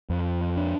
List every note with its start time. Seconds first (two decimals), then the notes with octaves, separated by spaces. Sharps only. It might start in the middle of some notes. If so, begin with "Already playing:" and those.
0.10 F2
0.57 D4